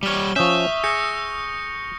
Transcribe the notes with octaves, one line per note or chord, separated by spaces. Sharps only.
G3 C#5 F6 G7
F3 C#4 E5 C#6 D#6 G6
G#4 G6 A#6 C#7